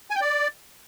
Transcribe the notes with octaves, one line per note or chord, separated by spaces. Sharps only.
G#5
G5
D5